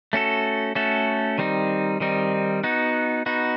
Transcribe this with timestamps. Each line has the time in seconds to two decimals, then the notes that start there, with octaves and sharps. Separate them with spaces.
0.13 A3 C#4 F#4 A4
0.75 A3 C#4 F#4 A4
1.38 D#3 G3 C4 D#4
2.00 D#3 G3 C4 D#4
2.64 B3 D#4 F#4
3.26 B3 D#4 F#4